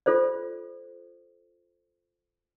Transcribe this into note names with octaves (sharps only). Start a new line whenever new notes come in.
F4 A4 C5 D5